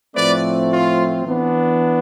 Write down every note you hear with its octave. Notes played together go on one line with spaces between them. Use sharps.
A2 F3 A3 C4 B4 D5
F4
E3 B3 D4